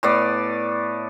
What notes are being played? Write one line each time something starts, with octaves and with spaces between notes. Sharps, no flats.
A2 B3 D5